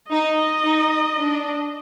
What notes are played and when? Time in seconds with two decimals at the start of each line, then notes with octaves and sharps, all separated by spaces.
0.11 D#4 D#5
0.65 D#4
1.17 D4